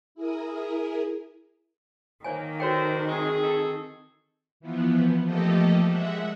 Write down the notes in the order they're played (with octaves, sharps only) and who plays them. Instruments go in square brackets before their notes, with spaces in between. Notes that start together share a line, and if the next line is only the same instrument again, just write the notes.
[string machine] E4 G#4 A#4 D#6
[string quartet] D#3 [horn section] A#3 [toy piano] C5 C#5 G#5
[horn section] D4 C5 [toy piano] F#4 C#5 G5 [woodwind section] A4 A#4
[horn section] A2 G#3 [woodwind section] C4 G#4
[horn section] A4
[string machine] E3 F3 B3
F3 A3 A#3 G4 A4 D#5
G#3 E5 F#5